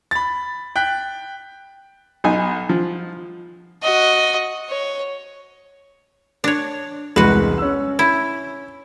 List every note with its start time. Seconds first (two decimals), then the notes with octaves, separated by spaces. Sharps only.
0.11 B5 A6
0.76 G5 F#6 B6
2.24 B1 D#4 G#5
2.69 F3
3.83 F#4 D#5
4.69 C#5
6.44 D4 C#5
7.16 E1 C2 G#3 F#4 B4
7.58 C#4 E6
7.99 E4